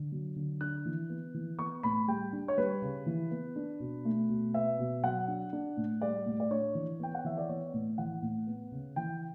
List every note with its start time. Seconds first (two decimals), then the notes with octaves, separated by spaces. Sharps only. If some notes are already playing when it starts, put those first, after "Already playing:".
Already playing: D3
0.12 F#3
0.36 D3
0.61 D4 F#6
0.86 E3
1.10 B3
1.34 E3
1.59 B3 C#6
1.83 A2 B5
2.08 G3 G5
2.33 D4
2.48 C#5
2.58 G3 B4
2.82 C#3
3.06 E3
3.31 B3
3.56 D4
3.80 B2
4.05 A3
4.29 B2
4.54 B3 E5
4.79 B2
5.03 F#3 F#5
5.28 D4
5.53 D4
5.77 A2
6.01 G3 D5
6.26 A2
6.40 D5
6.51 D4 C#5
6.75 E3
7.00 B3 G5
7.15 F#5
7.25 E3 E5
7.37 D5
7.49 B3 C#5
7.73 A2
7.98 E3 F#5
8.22 A2
8.47 B3
8.72 C#3
8.96 E3 G5